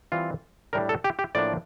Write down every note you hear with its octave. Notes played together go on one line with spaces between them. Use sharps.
E3 G3 C4 F4
A2 G3 D4 A#4
A4
G4
G4
A2 F3 A#3 D4 D5